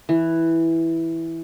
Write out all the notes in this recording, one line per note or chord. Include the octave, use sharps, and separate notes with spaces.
E3